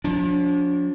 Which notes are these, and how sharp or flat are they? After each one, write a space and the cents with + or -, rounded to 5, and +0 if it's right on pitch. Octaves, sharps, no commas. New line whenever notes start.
F3 +45 D4 -30